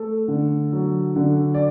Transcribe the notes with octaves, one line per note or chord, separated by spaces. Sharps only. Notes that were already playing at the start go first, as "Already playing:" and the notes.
Already playing: A3 A4
D3
F#3
D3
D5